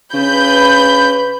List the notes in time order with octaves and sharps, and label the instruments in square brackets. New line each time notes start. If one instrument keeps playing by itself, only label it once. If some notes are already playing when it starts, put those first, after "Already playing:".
[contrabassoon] C#3 [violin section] B4 B5 G6